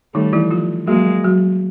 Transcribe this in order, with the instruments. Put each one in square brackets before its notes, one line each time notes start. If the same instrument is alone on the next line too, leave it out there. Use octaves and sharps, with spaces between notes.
[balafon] D#3 D#4 [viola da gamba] G3 A3
[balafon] E3 E4
F3 F4
[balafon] F#3 F#4 [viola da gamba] G#3 A#3
[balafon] F#3 F#4